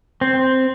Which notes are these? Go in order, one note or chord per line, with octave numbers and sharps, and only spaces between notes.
C4